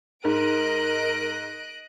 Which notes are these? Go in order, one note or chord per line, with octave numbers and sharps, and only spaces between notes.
G#2 A#4 D#5 F#6 D7